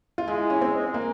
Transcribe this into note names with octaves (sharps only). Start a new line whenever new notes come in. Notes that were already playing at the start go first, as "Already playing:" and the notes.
F4
G#3 E4
C#4
C4
A#3